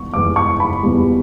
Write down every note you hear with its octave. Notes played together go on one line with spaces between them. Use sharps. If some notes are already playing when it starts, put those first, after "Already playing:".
Already playing: E2 B2 G3 C#6
E2 B2 G3 D6
C#6
B5
E2 B2 G3